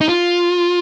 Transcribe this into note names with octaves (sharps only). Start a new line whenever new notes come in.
D#4
F4